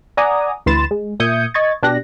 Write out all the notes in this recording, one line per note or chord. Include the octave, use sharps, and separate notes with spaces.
D5 F#5 G#5 A#5 D6 D#6
D2 E3 B5 C6 A6 E7
G#3
A#2 E5 D#6 G6 G#6 C#7
D#5 C#6 G#6 A6
B2 D4 G4 F#6 A#6